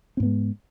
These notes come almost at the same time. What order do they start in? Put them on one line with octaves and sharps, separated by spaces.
C4 G#2 B3 G#3